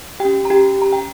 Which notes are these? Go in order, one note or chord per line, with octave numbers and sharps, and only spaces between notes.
C#4 G4 G5
A#5
G4 G5
A#5
G5